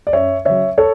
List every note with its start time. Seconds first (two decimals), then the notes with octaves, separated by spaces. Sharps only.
0.07 D5
0.13 F#2 C#5 E5
0.45 C#3 F#3 C#5 E5
0.78 A4 C#5